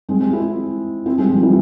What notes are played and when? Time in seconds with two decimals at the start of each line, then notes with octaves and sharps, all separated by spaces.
0.09 G#3 C4
0.20 G#3 C4
0.33 C4 E4
1.06 C4 E4
1.18 G#3 C4
1.30 F3 G#3
1.43 E3 G3